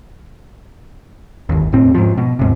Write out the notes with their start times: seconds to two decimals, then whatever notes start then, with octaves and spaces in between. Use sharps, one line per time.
1.49 G1 D#2
1.72 E1 A2 C4
1.94 G#2 F3
2.17 B2
2.39 D#2 G#2 C3